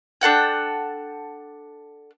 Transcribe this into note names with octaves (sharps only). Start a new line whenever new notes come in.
D4 A4 F#5 G5